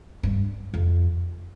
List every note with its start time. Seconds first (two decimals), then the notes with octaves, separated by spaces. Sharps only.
0.23 G2
0.74 F2